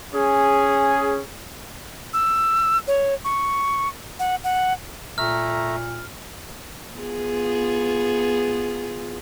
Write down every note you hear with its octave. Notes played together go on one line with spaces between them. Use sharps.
C#4 G#4
E6
C#5
C#6
F#5
F#5
A#2 A3 E5 A#5 F6
B3 F4 G#4